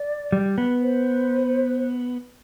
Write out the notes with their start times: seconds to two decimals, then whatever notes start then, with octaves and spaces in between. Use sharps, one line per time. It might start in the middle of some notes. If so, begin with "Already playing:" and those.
Already playing: D5
0.32 G3
0.58 B3
0.82 C5